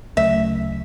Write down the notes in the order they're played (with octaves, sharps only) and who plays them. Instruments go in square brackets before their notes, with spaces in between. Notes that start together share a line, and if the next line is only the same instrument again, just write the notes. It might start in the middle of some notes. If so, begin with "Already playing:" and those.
[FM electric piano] D2 C#3 F#3 A3 [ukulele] E5